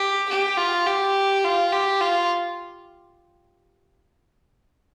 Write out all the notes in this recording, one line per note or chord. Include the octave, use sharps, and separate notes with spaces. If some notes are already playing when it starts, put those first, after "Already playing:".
Already playing: G4
G4
F4
G4
F4
G4
F4